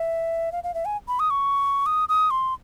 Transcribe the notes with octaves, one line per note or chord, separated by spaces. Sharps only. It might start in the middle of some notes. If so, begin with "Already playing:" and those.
Already playing: E5
F5
F5
E5
G#5
B5
D#6
C#6
D#6
D#6
C6